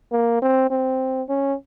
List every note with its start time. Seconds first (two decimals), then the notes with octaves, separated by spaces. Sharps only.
0.12 A#3
0.42 C4
0.70 C4
1.29 C#4